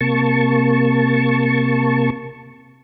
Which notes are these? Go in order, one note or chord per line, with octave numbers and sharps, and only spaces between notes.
C3 A#3 A5 C#6